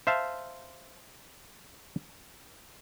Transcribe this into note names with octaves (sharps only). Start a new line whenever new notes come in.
C5 E5 F5 A5